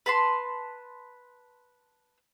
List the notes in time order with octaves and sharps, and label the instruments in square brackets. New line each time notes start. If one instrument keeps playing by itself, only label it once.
[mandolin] B4 A5 C6